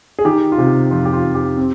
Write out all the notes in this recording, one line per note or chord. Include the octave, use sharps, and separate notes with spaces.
G#4
D#3 G4
F4
C3 G4
F2 F4
G4
F4
F2
G4
C4